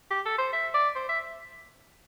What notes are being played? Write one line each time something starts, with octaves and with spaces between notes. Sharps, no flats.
G4
A4
C5
E5
D5
C5
E5